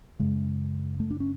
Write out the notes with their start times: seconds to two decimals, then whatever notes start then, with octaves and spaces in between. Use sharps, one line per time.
0.19 F#2 C#3 G#3
1.00 A3
1.10 D4
1.20 C#4